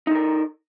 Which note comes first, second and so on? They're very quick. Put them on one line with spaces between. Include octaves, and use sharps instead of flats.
D#4 A4 A#4